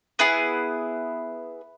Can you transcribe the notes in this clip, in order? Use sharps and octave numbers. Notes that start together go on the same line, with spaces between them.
B3 E4 G#4 B4